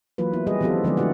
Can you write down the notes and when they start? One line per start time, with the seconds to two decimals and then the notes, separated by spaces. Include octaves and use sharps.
0.18 E3 F#3 A#3 F4 B4
0.33 B3 E4
0.47 G3 G4 G#4 B4 D#5
0.61 D#3 F3 B3 C4 F4 A4
0.84 D3 F3 G#3 B3 G#4 D5
0.97 A3 D4 E4 F#4 G4 F#5